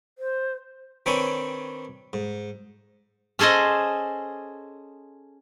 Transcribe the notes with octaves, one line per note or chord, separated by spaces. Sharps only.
C5
D#3 C4 D4 B4 C#5 G#5
G#2
C#4 G#4 A4 C5 D#5